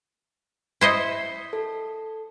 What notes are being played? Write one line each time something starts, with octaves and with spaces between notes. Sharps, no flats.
E4 C5 D#5 B6 C#7
A4